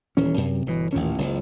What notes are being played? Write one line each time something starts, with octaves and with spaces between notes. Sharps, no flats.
D#1 E3 C#4
F#2 C3
G1 B2 E3
A1 D#2 A#2 C#4
F#1 C#2